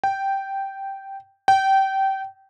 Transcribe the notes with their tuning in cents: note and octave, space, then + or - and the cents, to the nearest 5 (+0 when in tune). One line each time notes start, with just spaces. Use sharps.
G5 -5
G5 -20